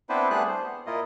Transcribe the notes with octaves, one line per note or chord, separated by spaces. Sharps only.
B3 C4 D4 E4 B4 C5
G3 A3 B3 D4 G#4 F#6
C5
B3
A#2 A#3 E4 F4 D#5